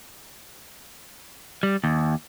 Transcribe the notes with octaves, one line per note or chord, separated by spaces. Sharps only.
G3
D#2